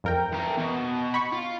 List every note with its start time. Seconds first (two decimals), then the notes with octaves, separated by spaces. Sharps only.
0.04 F2 A#4 G5
0.32 E3 A#5
0.58 B2
1.14 B5 C#6
1.33 F4